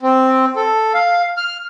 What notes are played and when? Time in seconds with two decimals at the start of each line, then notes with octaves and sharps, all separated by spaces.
0.03 C4
0.56 A4
0.94 F5
1.37 F6